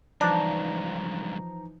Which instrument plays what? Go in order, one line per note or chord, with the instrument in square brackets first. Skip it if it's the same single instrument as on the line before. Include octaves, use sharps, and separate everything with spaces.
[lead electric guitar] C#2 G2 [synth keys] E3 F3 D#4 [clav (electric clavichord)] D4 [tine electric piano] A#5